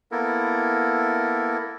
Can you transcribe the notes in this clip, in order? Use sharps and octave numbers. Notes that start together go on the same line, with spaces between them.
A#3 B3 E4 A4 A#4